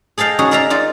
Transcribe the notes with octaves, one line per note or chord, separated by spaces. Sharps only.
G#4 A4 D#5 F5 G5
C#4 D#4 F#4 G#4
A#4 D5 E5 F5 A#5
D#4 F4 D5